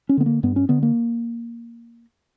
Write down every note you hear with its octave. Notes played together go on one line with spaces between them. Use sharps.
C#4
D3 B3
A#3
G2 B3
C#4
D3 B3
A#3